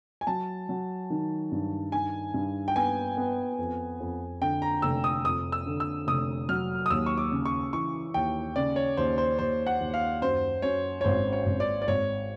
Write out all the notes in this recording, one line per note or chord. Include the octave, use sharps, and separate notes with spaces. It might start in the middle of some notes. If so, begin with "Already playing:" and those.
G#5
F#3 A5
F#3
D#3
G2
D#3 G#5
G2
G5
B3 G#5
B3
F2
F2
D3 G5
A#5
F1 E6
D#6
F2 D#6
E6
D3
E6
F1 D#6
F#3 F6
D#6
D#2 E6
C#6
D6
C#3
C#6
E3 C#6
D#2 G5
C#3 D5
C#5
D#2 C5
C5
D#2 C5
F#5
D#2
F5
F#2 C5
F#2 C#5
C#5
G#1 C5
C#5
G#1
D5
D5
G#1 C#5